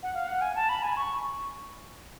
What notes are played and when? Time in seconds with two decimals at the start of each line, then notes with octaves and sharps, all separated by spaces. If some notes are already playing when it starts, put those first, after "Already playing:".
0.03 F#5
0.14 F5
0.28 F#5
0.41 G#5
0.55 A5
0.69 B5
0.83 G#5
0.97 C#6